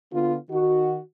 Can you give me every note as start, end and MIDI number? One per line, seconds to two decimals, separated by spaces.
0.13 0.37 50
0.13 0.37 59
0.13 0.37 65
0.51 0.98 51
0.51 0.98 63
0.51 0.98 66